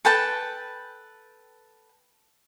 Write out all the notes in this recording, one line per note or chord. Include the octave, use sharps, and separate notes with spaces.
A4 B4 G5 A5